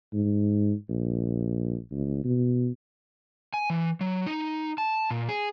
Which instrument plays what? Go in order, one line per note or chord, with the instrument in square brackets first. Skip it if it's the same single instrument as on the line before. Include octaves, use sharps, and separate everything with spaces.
[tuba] G#2
A#1
C#2
B2
[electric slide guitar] G#5
E3
F#3
D#4
A5
A#2
G#4